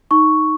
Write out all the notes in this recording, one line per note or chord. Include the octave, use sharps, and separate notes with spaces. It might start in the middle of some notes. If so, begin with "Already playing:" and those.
D#4 C#6